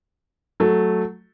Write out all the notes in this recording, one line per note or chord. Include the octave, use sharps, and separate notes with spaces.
F#3 A3